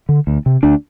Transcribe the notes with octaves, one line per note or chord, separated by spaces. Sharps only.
D3
D2
C3
D2 D4